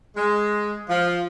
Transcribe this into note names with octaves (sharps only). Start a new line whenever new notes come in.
G#3
F3